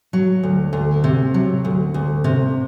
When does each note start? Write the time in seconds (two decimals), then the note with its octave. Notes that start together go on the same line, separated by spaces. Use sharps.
0.13 F#3
0.43 D2
0.73 D2
1.04 C3
1.34 F#3
1.65 D2
1.94 D2
2.24 C3